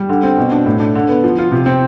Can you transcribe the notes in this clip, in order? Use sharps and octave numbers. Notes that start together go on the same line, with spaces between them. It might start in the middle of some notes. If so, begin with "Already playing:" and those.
Already playing: G3
D3
C4
B2
D4
A2
D4
D3
B3
F3
F4
C3
C4